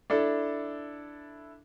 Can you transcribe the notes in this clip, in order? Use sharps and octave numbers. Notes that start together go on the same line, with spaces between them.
D4 E4 A4